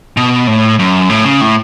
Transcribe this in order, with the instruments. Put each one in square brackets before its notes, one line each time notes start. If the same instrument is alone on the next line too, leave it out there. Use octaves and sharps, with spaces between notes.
[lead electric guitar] B2
A2
F#2
A2
C#3
A2